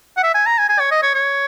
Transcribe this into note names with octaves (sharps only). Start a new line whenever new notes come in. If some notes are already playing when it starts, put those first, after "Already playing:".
F#5
E5
G#5
A#5
G#5
G#5
C#5
D#5
C#5
C#5